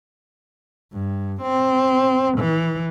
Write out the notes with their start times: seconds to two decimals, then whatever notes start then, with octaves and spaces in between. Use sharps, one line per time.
0.93 G2
1.42 C4
2.38 E3